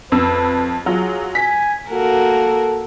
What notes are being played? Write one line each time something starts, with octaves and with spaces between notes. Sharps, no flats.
F2 B4 E6
F#3 F4 G#4
G#5 B6
A#3 F#4 A4 A#4